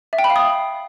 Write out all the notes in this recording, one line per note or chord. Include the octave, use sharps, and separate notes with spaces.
E5
G5
B5
F5
D#6